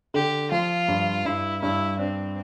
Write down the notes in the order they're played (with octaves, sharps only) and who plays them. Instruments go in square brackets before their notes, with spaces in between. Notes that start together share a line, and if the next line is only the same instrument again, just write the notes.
[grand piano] D3 [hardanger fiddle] G4
[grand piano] F3 [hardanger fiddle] F4
[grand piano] G2
[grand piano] G2 [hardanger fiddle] E4
[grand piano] G2 [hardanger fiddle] E4
[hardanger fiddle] C4 [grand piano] D4